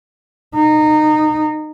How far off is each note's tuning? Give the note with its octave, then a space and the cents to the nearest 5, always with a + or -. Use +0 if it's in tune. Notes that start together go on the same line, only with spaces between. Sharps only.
D#4 -20